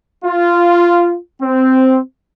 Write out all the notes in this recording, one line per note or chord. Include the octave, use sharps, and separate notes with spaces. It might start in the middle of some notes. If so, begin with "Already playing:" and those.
F4
C4